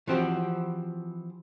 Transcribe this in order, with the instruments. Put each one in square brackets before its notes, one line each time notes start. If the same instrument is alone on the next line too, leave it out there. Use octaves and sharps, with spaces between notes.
[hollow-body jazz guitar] E3 F3 C4 F#4 G4